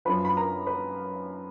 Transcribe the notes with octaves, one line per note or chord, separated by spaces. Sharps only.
F#2 F3 B4 B5
B5
A#4 A#5
B4 B5